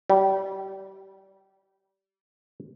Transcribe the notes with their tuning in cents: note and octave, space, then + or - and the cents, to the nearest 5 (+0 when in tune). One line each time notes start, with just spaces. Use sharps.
G3 -25